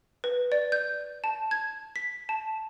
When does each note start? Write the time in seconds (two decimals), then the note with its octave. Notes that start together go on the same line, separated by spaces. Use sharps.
0.24 B4
0.52 D5
0.72 G6
1.24 A5
1.51 G#6
1.96 B6
2.29 A5